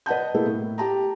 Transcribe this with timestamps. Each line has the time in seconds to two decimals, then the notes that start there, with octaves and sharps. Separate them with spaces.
0.06 B4 D#5 F#5 A5 G6
0.34 A3 A#3 E4 G#4 A4 B4
0.46 A2
0.78 G4 A5 A#5